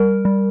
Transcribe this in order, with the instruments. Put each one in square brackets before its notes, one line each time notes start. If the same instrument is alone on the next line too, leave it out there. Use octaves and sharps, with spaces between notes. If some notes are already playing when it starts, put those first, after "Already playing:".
Already playing: [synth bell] G3 A#4
G3